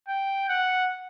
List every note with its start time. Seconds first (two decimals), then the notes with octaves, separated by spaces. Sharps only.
0.08 G5
0.49 F#5